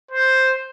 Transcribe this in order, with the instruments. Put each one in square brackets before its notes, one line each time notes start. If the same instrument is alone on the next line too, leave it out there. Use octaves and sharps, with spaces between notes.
[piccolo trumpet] C5